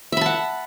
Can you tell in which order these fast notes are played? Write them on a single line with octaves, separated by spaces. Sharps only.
E5 B5 A5 F#5